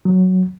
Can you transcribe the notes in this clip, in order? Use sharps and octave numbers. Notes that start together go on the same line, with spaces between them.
F#3